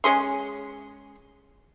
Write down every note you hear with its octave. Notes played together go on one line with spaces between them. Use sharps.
G#3 C#4 G#4 C6